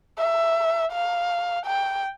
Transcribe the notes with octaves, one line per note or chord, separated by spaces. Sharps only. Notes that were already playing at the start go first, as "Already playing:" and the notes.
E5
F5
G5